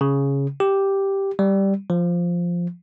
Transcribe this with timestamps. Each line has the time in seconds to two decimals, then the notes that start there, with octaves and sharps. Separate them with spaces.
0.01 C#3
0.60 G4
1.39 G3
1.90 F3